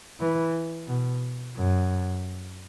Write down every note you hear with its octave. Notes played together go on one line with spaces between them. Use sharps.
E3
B2
F#2